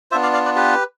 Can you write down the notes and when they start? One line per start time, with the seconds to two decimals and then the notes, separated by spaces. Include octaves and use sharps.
0.11 B3 D4 F4 C5 E5
0.23 D5 F5
0.33 D5 F5
0.45 B4 D5
0.56 G4 B4